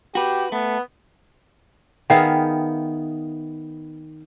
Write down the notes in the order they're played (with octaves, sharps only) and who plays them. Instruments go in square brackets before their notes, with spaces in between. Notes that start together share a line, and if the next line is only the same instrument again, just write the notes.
[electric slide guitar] F#4 B4 [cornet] G4
[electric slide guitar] A3 [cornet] B3
[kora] D#3 B3 G#4 [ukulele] E5 F5 G5